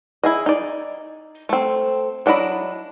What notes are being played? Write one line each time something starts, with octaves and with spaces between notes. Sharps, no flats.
E4 G#4 D#5
D#4 D5
A3 C4
F#3 D4 E4 D#5 B5